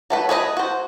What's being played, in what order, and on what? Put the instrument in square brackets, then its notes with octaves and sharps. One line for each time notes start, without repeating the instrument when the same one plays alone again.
[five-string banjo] F#3 A3 B4
G#4 B4 C5 D#5
F#4 C5